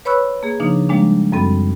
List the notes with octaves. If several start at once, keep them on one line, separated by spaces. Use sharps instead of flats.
B4 C#5 B5 C#6 E6 F#6
A#3 G#4
C#3 F3 A#3 D4 D#4
F3 G3 G#3 A#3 D4
F#2 G3 C4 A4 B5